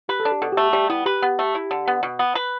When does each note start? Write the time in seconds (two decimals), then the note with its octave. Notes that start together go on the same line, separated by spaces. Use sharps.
0.09 G4 B4
0.20 A4
0.25 D4
0.31 G4
0.42 B2 A4
0.52 A3 G4
0.73 G3 G4
0.90 B3 E4
1.06 G4 B4
1.22 B3
1.39 A3
1.55 E4
1.71 D3
1.87 B3
2.03 B2
2.19 B3
2.35 B4